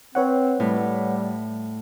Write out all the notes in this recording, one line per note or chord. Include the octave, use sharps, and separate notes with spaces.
C4 B4 C#5 F#5
A2 G3